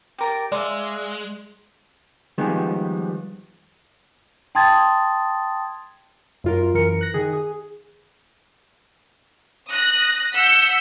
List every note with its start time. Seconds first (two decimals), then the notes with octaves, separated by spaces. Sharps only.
0.18 G4 A#4 D5
0.52 G#3 D5 E5 F5 C6
2.38 D#3 F3 G3 G#3 B3
4.55 G5 A5 C6 D#6 G#6 A6
6.44 F#2 F4 A#4
6.74 F#2 E3 A#4 C#7
7.01 F#6 A#6
7.14 D#3 G#4
7.33 G#4
9.69 D#6 F#6 A#6
10.34 F#5 E6 G6 B6 C#7